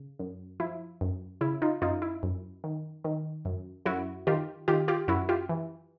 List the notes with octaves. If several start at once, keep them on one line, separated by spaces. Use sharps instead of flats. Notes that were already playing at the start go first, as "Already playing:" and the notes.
Already playing: C#3
F#2
F3 E4
F#2
C#3 E4
D#4 F4
F#2 D#4 F4
E4
F#2
D#3
D#3
F#2
F#2 E4 F#4
D#3 F4 G4
D#3 F4 G4
F4 G4
F#2 E4 F#4
F4 G4
E3